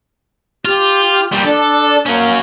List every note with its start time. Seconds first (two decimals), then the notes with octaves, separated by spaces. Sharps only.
0.65 F4 G4
1.32 A#2 G3
1.43 D4 A4
2.06 F#3 A#3 C#4